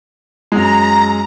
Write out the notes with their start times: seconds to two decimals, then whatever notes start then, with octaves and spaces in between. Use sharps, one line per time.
0.52 F#2 G#3 A#5